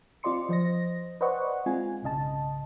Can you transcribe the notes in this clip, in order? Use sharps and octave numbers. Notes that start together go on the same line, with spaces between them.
C4 F4 D5 D#5 C6 C#7
F3 C5 D#5 A#6
B4 C5 D5 D#5 F#5 C#6
G#3 C4 F4 G#5
B1 G#2 C#3 D#5 A5